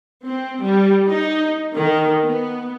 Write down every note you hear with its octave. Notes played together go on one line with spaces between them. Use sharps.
C4
G3
D#4
D#3
B3